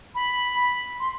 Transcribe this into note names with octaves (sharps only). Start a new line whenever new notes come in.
B5
C6